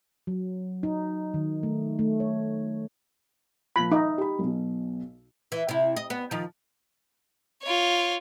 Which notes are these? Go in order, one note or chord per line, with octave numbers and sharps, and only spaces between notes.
F#3
D#4
D#3
A3
A3
C#5
A#2 F3 B5
D#4 E5
G4 B5
B1 B2
E3
C3 E4
D#5
B3
D#3 F3
F4 C#5